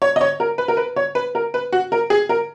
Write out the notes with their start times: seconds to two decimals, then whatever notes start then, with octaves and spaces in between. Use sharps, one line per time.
0.02 C#5
0.16 D#5
0.21 C#5
0.40 A#4
0.58 B4
0.68 A#4
0.77 B4
0.96 C#5
1.15 B4
1.35 A#4
1.54 B4
1.72 F#4
1.92 A#4
2.10 G#4
2.29 A#4